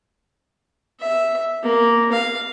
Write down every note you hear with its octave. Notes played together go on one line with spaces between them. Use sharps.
E5
A#3
F5